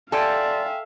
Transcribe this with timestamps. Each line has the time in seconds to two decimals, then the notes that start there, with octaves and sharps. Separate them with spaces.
0.12 A4 D5 E5 F5 G5 G#5 C6